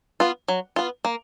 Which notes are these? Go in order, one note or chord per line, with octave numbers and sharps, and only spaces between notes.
B3 F4
F#3
B3 F4
A#3